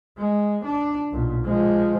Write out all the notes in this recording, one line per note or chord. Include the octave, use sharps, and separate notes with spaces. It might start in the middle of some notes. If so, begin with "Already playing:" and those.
G#3
D4
B1 A#2
F3 G#3